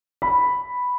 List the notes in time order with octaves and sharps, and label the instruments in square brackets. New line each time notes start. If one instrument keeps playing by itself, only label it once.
[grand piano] B5